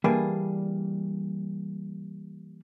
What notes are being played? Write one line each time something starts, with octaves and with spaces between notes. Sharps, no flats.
E3 G3 A#3 D4 G#4 B4